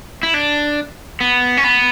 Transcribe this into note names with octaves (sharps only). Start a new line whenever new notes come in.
E4
D4
B3
C#4
B3